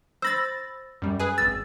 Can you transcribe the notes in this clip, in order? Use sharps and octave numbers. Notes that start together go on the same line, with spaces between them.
C5 B5 E6 A6 A#6
F#2 G3
G#4 B4 G#5
G#1 E6 A6